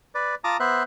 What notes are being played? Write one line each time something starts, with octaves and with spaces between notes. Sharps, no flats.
B4 D5
F4 A5 A#5 D6 D#6
B3 C5 E5 F#6